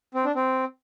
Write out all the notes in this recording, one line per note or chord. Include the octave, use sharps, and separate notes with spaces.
C4
D4
C4